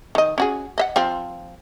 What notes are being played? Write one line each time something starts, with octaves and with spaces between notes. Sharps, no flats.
D#3 D#5
C#4 F#4 G#4
D#5 E5 F#5
F3 C4 F4